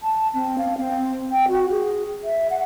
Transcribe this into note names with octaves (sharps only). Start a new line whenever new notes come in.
A5
C4
F5
C4
G5
F#4
G#4
E5
F#5